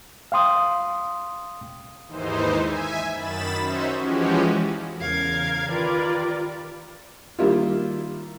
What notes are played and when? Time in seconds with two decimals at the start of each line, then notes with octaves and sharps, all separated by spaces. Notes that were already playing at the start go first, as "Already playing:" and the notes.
0.32 F5 G5 C6 D#6
2.07 D#2 G#2 E3 D#4 C5
2.62 E5 G#5
3.13 F#2 D#3 B5 A6 E7
3.59 C#4 D#4 F#4 C5 E5
3.99 E3 F3 G#3 C#4 F#4 G4
4.97 E2 C#3 A#4 F5 G#6
5.69 D#3 F4 G4 A#4 B4 D5
7.39 D#3 G3 A#3 E4 F4